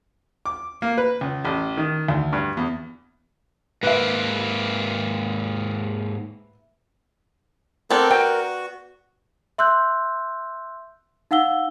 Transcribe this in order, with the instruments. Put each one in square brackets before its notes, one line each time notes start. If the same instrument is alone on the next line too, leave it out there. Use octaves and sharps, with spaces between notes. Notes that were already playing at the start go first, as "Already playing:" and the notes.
[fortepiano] D6
A#3
B4
C#2
A1
D#3
D2
G2
E2
[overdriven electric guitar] G#2 A#3 [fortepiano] B4 E5
[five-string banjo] B3 D5 [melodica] C4 A4 G5 [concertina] A#4
[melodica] F#4 [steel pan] G5
[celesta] E5 C6 E6 F#6 G6
D#4 F5 F#5 E6 G7